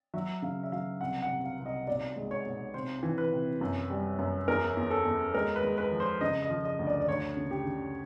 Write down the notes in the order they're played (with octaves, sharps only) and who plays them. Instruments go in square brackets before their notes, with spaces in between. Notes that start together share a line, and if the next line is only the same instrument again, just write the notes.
[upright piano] F#3 E5
C#3 F5
E5
F#3 F5
C2 F#5
F#5
C3
F5
C2
D#5
B1 D5
G#3
C#5
B1
C3 C5
E3
B4
C3
F#2
G3
F#2
E2 A#4
E2
A4
E2
G#3 A#4
B4
G#3
B4
F3
C5
C#3 D#5
D#5
F3
D#5
D2
D5
D5
D2 C#5
C#3
G4
C#3